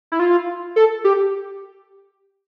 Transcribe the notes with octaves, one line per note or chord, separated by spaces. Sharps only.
E4
F4
A4
G4